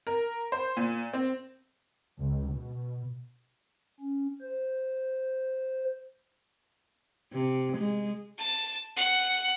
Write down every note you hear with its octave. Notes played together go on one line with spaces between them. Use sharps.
A#4
C5
A#2
C4
C#2
B2
C#4
C5
C3
G#3
A5
F#5